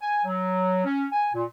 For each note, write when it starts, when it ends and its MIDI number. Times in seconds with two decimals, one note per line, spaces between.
0.01 0.22 80
0.25 0.84 54
0.85 1.06 61
1.12 1.32 80
1.34 1.44 46